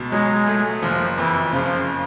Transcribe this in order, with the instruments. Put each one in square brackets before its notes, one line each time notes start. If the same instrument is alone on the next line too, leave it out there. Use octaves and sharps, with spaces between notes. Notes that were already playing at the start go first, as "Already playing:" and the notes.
Already playing: [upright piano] C#2 B2
[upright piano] F#3 [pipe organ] G#3
[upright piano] A3
[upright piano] F#1 [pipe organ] F3
[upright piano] F2 [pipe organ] E3
[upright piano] C#3 [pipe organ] F3